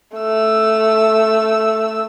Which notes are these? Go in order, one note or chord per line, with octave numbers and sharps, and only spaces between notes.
A3 E6